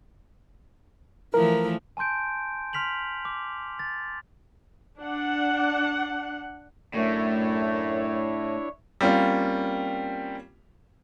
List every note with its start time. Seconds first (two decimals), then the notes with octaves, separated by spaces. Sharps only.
1.34 E3 F3 A3 A#4
1.97 G#5 A5 C6 G6 D7
2.73 C6 F6 B6 F7 F#7
3.25 D6
3.79 A6
4.98 D4 F#5
6.94 F#2 A2 A3 D4 E4 C#5
9.01 G3 A#3 C4 C#4 F4